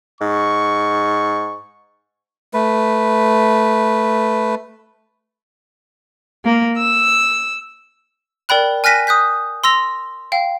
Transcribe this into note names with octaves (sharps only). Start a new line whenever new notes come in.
G#2 C#6
A3 B4
A#3
E6
A#4 D5 G5 B5 F#6
G#5 F6 F#6 A#6 B6 D#7
D#6 F#6 G6 B6
C6 E6 A#6 F7
F5 G5